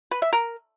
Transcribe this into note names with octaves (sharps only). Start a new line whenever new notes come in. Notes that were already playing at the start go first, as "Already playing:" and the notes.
B4
E5
A#4